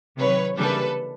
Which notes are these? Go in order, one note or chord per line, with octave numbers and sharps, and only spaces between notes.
C3 D#3 F#3 B4 C#5
C#3 E3 G3 A#3 D4 A4 B4